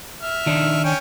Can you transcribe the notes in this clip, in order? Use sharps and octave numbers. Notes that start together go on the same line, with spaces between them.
E5 F6
D#3 D4 D#4
C#4 G5